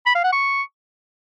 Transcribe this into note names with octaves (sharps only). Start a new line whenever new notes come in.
B5
F5
F#5
C#6